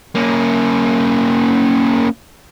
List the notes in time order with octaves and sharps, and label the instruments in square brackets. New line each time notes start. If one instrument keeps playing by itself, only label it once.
[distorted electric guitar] A#3 C#4